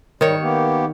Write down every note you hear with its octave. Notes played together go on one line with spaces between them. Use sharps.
G#2 D#3 G3 C#5
A#3 B3 G4